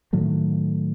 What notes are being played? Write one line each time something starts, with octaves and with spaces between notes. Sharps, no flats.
A2 D#3 F#3 A3